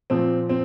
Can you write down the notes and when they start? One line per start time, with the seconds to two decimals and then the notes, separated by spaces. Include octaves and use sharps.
0.10 A#2 F3 C4
0.49 C4